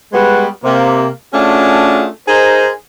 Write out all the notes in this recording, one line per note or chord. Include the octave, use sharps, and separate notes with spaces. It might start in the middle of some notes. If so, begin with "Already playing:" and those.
G3 G#3 B3 F#4 B4
C3 A#3
A3 C#4 D4 F4 F#4 G#4
D#4 G#4 A#4 C5